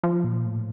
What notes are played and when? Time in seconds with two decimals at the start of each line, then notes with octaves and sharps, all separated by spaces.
0.03 F3
0.24 A#2
0.46 A2